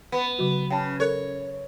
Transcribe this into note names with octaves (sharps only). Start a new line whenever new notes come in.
B3
C#3 F#3 F#4
C#3 G5 A5
A4 A#4 C#5 F#6